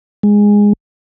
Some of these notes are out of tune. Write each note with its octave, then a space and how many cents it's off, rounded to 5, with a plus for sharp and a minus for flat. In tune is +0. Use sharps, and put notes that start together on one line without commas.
G#3 -10